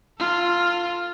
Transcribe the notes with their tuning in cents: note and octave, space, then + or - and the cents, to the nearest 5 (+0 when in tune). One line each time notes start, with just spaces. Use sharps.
F4 +0 A4 +35